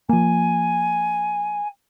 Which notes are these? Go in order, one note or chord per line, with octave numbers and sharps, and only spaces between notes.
F3 A#3 G#5